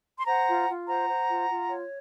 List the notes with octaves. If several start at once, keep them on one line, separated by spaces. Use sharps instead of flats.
C6
C5 F#5 A#5
F4
F4
C5 F#5 A#5
C5
F4
F4
C#5